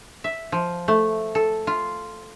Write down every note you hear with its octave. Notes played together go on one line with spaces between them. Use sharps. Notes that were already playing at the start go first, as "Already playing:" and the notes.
E5
F3
A3
A4
F4